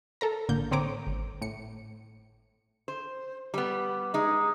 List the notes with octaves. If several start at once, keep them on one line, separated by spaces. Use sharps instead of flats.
A4 A#4 A#5
A1 D3 A#3 G6
D3 C4 C#5 A#5 D6
G#1
A2 C#7
C5
G3 B3
G#3 D#4